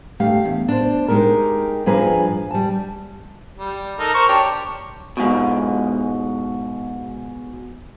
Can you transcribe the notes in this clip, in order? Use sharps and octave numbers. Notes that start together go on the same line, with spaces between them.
G2 A3 G4 F5
E2
D4 C5
G#3 D#4 G4 A#4
G2 F3 G#4 B4 G#5 A#5
G3 A5
G3
D#4 A4 A#4
A#4 C5 C#6
D4 G4 C#5
G#2 B2